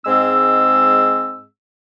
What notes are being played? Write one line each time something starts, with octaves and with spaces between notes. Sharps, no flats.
G#2 G#3 C4 E6